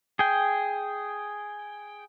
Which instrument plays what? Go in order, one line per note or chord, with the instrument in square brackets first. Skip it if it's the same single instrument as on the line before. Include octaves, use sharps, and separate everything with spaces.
[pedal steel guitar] G#4 G5